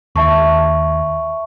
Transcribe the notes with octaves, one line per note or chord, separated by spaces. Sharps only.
D#2 E5 A5 C#6